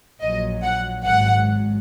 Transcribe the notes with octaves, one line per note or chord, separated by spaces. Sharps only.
A#1 A#2 F#3 D#5
F#5
G#1 G#2 F#3 F#5